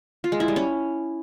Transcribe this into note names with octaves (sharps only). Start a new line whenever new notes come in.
F4
G#3
E4
G3
C#4